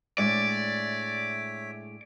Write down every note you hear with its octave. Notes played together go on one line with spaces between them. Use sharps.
A2 G#3 D4 C#5 D5 E5